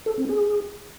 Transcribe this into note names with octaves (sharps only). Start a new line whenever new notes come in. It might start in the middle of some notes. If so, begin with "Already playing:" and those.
A4
C4
G#4